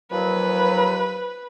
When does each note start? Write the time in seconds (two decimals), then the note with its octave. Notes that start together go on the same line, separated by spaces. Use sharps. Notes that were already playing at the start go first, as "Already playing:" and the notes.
0.11 D#2 F3 F#3 B4